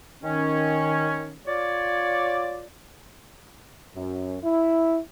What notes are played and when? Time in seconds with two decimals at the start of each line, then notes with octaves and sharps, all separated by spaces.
0.23 D#3 C#4
1.47 F4 C#5 D5
3.95 F#2
4.43 E4